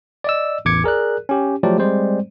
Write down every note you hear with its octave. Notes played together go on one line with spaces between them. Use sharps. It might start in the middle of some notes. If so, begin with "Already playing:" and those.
D5 D#5 E6
A1 E2 D6 G#6 C#7
G#4 A#4 D5 F#6
C#4 G4
F3 F#3 A3 G4 D5
G3 G#3 C4 C5 D5